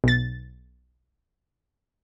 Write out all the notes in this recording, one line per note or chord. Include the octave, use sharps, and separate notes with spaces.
B1 A6